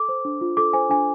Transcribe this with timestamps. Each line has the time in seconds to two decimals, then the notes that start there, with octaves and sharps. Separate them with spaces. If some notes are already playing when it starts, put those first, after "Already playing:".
Already playing: A4 D6
0.09 C5
0.25 D4
0.41 F4
0.57 A4 D6
0.73 C5 G#5
0.90 D4 G#5